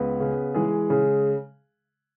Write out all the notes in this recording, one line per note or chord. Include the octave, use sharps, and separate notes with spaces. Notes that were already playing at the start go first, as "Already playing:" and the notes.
Already playing: C#2 B3 B4
C#3
E3 G#3 G#4
C#3